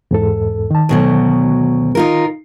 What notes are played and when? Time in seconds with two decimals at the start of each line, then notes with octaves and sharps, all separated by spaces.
0.11 E2 G#2 A4
0.71 D#3 A5
0.89 D2 B2 F#3
1.95 D#4 F4 A#4